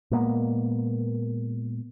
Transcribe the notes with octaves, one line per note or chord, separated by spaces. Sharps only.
A#2 G#3 A#3 B3